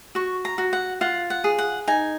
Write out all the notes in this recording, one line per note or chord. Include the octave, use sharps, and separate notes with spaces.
F#4 C#6
A#5
F#4
F#5
F4 F#5
F#5
G#4
F#5
D#4 G#5